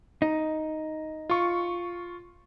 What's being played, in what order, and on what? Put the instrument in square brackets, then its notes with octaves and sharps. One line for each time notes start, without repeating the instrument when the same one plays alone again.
[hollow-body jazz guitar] D#4
[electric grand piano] F4 C#6